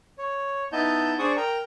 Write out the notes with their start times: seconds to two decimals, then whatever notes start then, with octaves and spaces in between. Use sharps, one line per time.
0.18 C#5
0.72 B3 D#4 E4 D#5 A5 G6
1.19 D4 G#4 C5 D5 C#6 D#6
1.37 A#4 G5 A#5